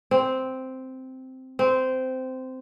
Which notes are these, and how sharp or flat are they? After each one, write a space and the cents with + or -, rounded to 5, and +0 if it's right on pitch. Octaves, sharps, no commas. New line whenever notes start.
C4 -5
C4 -15